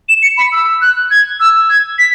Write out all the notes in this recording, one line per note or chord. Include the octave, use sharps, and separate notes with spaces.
E7
C#7
B5
E6
F#6
G#6
E6
G#6
B6